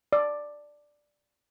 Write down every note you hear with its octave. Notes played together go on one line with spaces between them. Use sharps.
D5